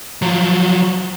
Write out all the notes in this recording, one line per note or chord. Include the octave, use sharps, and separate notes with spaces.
F3 F#3